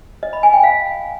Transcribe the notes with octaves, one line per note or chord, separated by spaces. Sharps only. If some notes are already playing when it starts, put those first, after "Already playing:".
D#5
B5
G#5
G5
F5